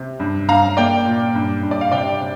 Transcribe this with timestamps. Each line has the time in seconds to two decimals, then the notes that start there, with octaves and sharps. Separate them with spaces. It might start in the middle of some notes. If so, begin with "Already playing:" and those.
Already playing: C3
0.20 G2
0.48 G2 F5 A#5
0.77 A#3 D5 G5
1.06 A#2
1.35 G2
1.63 G2
1.71 D5
1.81 F5
1.92 C3 D5 G5
2.20 C3